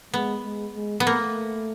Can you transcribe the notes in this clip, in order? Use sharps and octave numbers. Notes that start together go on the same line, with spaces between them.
G#3 B3
G#3
G#3
B3
A3 A#3